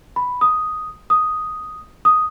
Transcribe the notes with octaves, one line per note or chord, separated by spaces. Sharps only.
B5
D#6
D#6
D#6